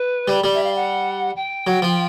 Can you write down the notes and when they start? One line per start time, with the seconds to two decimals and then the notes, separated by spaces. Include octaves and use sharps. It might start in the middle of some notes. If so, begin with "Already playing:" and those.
Already playing: B4
0.28 G3
0.44 G3
0.53 E5
0.64 F5
0.75 F#5
1.36 G5
1.67 F#3
1.82 F3